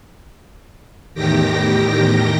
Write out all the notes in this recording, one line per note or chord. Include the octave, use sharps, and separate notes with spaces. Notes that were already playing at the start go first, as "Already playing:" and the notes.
E2 A2 D#3 G4 G5 A#6